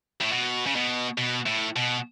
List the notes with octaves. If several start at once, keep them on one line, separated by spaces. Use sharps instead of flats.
A2
B2
C#3
B2
B2
A2
B2